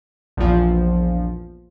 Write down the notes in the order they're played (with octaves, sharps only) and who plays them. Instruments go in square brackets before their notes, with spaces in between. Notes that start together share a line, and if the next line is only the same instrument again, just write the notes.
[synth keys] A#1 E2 F3